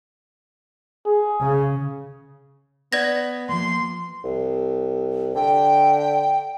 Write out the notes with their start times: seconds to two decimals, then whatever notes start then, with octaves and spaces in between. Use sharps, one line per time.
1.06 G#4
1.40 C#3
2.93 B3 D5 G#6 A#6
3.49 F3 A#3 C6
4.23 C2
5.35 D3 G5